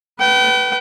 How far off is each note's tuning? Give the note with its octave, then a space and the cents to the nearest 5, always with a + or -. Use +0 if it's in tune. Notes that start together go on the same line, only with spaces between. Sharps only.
B4 -5 G5 -35